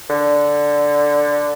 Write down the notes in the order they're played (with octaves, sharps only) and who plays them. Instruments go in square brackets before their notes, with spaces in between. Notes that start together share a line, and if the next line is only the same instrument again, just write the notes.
[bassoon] D3